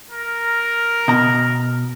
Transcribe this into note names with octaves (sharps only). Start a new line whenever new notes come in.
A#4
B2 A#5